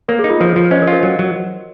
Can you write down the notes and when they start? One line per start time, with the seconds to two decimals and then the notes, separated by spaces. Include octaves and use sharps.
0.08 A#3 A#4 C#5
0.19 G#4
0.24 D#4
0.30 F4
0.40 F3 A#4 C#5
0.56 F3
0.71 C#4 C5 D#5
0.82 A#4 C#5
0.87 F4
0.92 A#4 C#5
1.03 F#3 A#4
1.19 F#3